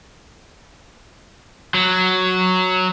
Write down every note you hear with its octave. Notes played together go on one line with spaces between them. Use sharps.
F#3